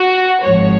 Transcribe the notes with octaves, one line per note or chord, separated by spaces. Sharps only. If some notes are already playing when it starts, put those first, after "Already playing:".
Already playing: F#4
G#1 G#2 F3 C#5